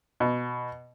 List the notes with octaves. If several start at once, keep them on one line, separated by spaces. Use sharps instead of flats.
B2